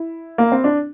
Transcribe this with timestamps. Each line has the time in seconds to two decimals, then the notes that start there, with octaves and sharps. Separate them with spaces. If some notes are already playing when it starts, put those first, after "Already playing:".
Already playing: E4
0.38 A#3
0.52 C4
0.64 D4